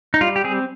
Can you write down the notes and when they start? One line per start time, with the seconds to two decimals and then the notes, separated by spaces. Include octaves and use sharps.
0.14 D#4
0.21 G3 F4
0.36 G4
0.44 C4 G#4